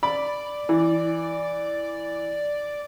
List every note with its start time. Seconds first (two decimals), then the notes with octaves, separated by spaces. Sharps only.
0.03 D5 B5
0.69 E3